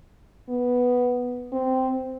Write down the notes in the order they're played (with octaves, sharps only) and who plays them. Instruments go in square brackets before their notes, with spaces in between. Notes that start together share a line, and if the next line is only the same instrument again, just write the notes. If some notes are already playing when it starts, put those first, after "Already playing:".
[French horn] B3
C4